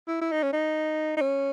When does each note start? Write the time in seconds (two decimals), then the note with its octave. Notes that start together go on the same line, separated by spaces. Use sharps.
0.08 E4
0.22 E4
0.32 D#4
0.43 C#4
0.53 D#4
1.17 D#4
1.21 C#4